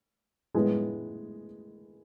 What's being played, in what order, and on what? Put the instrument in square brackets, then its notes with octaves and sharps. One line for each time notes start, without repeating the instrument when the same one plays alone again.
[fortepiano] A2 G#3 B3